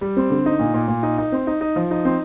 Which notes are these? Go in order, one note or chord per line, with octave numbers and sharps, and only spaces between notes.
G3
C4
D3
D#4
A#2
A#2
A#2
D#4
D#4
C4
D#4
D#4
F3
D#4
C4